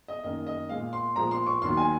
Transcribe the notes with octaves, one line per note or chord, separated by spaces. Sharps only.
D#5
F#2 D#3 A#3 D#5
D#5
A#2 G#3 F5
C6
A#2 F3 G#3 A#5
C6
C#6
D#2 D#3 F#3 A#3 C6
G#5